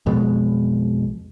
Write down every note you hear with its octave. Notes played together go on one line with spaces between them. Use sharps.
B1 F2 B2 G#3